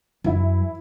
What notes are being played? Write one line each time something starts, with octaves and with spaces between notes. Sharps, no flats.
F#2 E3 E4